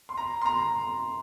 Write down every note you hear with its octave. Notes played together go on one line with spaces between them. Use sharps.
C6
A#5
C6
A#5